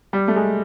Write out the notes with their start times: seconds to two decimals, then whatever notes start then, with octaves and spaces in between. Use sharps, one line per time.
0.13 G3
0.28 A3
0.36 G#3